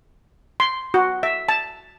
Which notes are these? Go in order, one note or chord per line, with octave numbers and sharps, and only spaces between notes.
C6
F#4
E5
A5